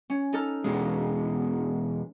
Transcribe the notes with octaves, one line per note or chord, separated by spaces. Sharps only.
C#4
D#4 A4 F6
E2 B2 G#3